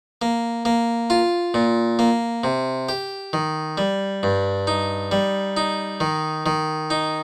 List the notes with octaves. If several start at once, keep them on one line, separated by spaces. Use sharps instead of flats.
A#3
A#3
F4
A#2
A#3
C3
G4
D#3
G3
G2
D#4
G3
D#4
D#3
D#3
D#4